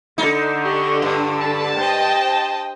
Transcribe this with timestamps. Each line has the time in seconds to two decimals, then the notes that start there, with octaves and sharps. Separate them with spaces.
0.18 D3 D#4
0.64 G4 D5 D#5 C#6
1.02 G2 F4
1.41 A5 B5
1.78 C5 D#5 G5